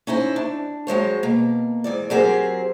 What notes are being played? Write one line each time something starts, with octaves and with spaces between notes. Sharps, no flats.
C#4 D#4 E4 C5
D4
F#3 G#3 C5 C#5
B2 A#3
G#2 E3 D5
F#3 C4 G4 G#4 A#4 C5